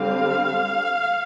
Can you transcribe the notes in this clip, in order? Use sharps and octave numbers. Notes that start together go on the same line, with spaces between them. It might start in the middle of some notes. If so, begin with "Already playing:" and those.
Already playing: D3 G3 C4 F5